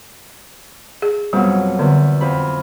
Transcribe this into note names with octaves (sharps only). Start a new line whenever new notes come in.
G#4
F2 B2 F#3 G3
E2 D3
F2 B5